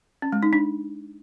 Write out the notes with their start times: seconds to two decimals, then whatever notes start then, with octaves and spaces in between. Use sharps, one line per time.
0.22 C#4
0.32 G#3
0.43 D#4
0.53 D4